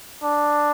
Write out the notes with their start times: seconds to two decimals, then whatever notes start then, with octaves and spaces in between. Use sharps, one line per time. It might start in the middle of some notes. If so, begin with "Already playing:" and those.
0.23 D4